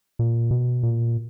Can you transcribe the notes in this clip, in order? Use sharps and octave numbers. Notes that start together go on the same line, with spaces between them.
A#2
B2
A#2